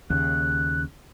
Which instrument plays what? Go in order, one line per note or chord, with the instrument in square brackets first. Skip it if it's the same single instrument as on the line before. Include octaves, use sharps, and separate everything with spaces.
[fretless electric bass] D#2 C#3 [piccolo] F#6